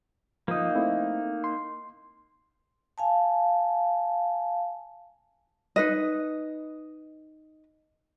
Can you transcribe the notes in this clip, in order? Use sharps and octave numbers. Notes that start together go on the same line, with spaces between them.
F3 A#3 D#4 D#6
A3 C4 E4
C6
F5 G#5 A5
D#4 B4 D#5